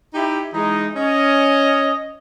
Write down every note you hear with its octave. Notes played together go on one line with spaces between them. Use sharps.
D#4 E4 G4
E3 G#3 D#4
C#4 D#5